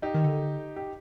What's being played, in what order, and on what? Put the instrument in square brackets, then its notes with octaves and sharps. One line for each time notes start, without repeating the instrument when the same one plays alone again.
[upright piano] D#4 G4
[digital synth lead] D#3
D3
[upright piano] G4